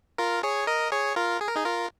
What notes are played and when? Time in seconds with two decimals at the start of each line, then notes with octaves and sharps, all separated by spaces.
0.18 F4 A#4
0.43 G#4 C#5
0.67 A#4 D#5
0.92 G#4 C#5
1.16 F4 A#4
1.41 G#4
1.48 A#4
1.55 D#4 G#4
1.65 F4 A#4